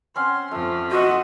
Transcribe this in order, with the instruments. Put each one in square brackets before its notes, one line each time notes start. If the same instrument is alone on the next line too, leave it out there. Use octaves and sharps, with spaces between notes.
[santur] C4 C#4 F#5 [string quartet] C6
[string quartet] F2 F3 [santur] A3
[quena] F#4 [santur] C5 E5 [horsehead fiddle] D#5 F#5